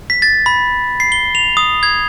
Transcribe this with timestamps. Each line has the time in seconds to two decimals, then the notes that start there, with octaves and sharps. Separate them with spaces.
0.10 B6
0.22 A6
0.46 B5
1.00 C7
1.12 G7
1.35 F7
1.57 D#6
1.83 G#6